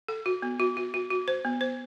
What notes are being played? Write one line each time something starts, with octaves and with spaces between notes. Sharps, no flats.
A4
F#4
B3
F#4
F#4
F#4
F#4
C5
B3
C5